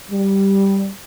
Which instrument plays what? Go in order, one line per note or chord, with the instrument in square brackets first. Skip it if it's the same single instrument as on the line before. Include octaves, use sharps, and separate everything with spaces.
[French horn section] G3